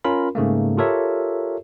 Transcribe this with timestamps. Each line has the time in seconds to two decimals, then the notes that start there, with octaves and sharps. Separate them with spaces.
0.04 C#4 F4 A#4 B5
0.35 G#2 C#3 A3 A#3
0.78 F4 G4 A4 A#4 C#5 E5